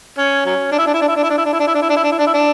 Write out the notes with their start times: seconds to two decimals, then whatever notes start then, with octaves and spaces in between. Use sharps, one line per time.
0.18 C#4
0.46 F#3 C#4
0.72 D4
0.79 E4
0.87 D4
0.94 E4
1.01 D4
1.08 E4
1.16 D4
1.24 E4
1.30 D4
1.38 E4
1.45 D4
1.53 E4
1.60 D4
1.68 E4
1.74 D4
1.82 E4
1.90 D4
1.97 E4
2.04 D4
2.12 E4
2.19 D4
2.27 E4
2.34 D4